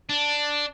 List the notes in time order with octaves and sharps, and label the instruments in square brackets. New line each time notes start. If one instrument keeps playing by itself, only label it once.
[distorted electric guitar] D4